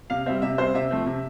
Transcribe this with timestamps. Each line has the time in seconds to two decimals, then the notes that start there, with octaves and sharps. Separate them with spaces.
0.10 C3 F5
0.26 G3 C4 E5
0.42 C3 E5
0.58 G3 C4 C5
0.74 C3 E5
0.91 F3 A3 C4
1.06 C3